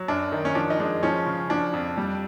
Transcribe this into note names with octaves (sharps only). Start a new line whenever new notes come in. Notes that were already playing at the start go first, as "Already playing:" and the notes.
Already playing: F#3
F#2 D4
D#3
C#4
F3 D4
D#4
G#3 D4
F3 C#4
C#3
F3 D4
F2
G3